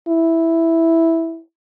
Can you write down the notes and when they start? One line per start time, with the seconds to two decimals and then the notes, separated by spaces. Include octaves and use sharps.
0.08 E4